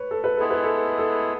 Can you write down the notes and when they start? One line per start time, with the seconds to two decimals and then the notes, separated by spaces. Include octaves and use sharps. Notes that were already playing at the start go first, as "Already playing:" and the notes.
Already playing: B4 C#5
0.11 A4
0.24 B4
0.37 G#3 B3 E4 G#4 A4
0.50 B4
0.64 A4
0.98 A4